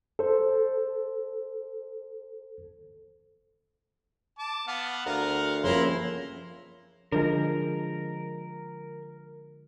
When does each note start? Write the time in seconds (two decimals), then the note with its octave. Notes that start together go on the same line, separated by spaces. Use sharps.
0.19 A4 C5
4.39 A5 D6
4.67 B3 F5 F#5
5.06 D2 A#4 F5 F#5
5.64 C#3 F3 A#3 C#4 E4 A#5 C6
7.12 D3 F3 G#3 A#4